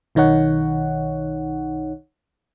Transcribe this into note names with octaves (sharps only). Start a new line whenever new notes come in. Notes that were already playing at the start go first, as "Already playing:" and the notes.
B1 D#3 D#4 C#5 F#5